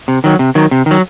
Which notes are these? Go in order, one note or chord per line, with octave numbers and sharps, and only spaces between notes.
C3
D#3 F#3
C3
D#3 F#3
C3
D#3 F#3